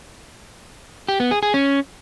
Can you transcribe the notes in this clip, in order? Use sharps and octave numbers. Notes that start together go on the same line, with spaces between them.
G4
B3
G#4
G#4
C#4